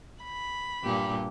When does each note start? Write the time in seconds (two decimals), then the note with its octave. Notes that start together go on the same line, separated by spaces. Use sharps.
0.24 B5
0.83 G2 A#2 G4